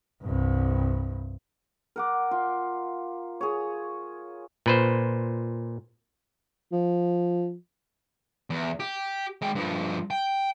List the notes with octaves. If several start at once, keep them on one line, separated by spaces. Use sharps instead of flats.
C2 G2
A#4 F#5 D6
F4
G#4 C#5
A#2 B4 C5
F3
E2
G4
G#3 G5
G2 F3
G5